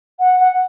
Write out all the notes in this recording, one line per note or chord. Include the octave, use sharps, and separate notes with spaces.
F#5
F#5